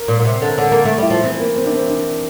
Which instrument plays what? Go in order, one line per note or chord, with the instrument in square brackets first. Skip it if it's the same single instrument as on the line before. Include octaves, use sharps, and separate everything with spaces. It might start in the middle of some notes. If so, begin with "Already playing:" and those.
Already playing: [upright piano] A#4
[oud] A#2
A#2
C3
D3
[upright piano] A#4
[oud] D3 [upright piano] A4
[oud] A#3
A3
[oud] G3 [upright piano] E4
[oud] F3
[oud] E3 [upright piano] C4
[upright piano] A#3
C4
D4
C4
D4